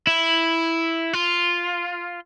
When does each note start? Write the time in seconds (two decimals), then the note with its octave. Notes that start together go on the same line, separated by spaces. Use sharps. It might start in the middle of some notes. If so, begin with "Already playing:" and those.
0.07 E4
1.13 F4